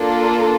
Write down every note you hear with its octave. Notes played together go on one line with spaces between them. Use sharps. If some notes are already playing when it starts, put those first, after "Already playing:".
Already playing: A#3 D4 F4 A4